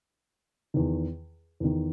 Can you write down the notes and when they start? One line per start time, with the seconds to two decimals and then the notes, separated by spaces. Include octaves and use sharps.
0.74 E2 D#3
1.60 E2 D#3